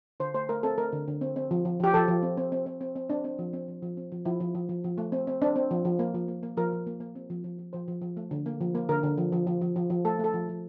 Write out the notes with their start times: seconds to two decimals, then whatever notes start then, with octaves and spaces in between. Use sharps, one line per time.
0.20 D3 C5
0.34 A3 C5
0.49 A3 A#4
0.63 C4 A4
0.78 A3 A#4
0.92 D3
1.08 D3
1.21 C4
1.36 C4
1.51 F3
1.65 F3
1.80 F3 G4
1.94 F3 A4
2.08 F3
2.23 C4
2.37 C4
2.52 C4
2.66 C4
2.81 C4
2.96 C4
3.10 C4 D4
3.24 C4
3.39 F3
3.53 C4
3.68 F3
3.83 F3
3.97 C4
4.12 F3
4.25 F3 E4
4.40 F3
4.55 F3
4.69 F3
4.84 F3
4.98 A3
5.12 C4
5.27 C4
5.42 C4 D4
5.56 C4
5.71 F3
5.85 F3
5.99 A#3
6.14 F3
6.28 A#3
6.43 A#3
6.57 F3 A#4
6.72 F3
6.87 A#3
7.00 A#3
7.15 C4
7.30 F3
7.44 F3
7.59 F3
7.73 F3 C5
7.88 F3
8.02 F3
8.17 A3
8.31 D3
8.46 A#3
8.61 F3
8.75 A#3
8.89 D3 A#4
9.03 D3
9.18 F3
9.32 F3
9.47 F3
9.61 F3
9.76 F3
9.90 F3
10.05 A3 A4
10.19 A3 A4
10.34 F3
10.49 F3